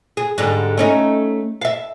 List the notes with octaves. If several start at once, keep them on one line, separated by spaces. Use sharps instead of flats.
G#4
G#2 D3 G3
A3 C#4 D#4
E5 F5